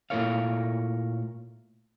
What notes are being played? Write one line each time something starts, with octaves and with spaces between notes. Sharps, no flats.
A#2 A3 E4 A#4 C#5 F5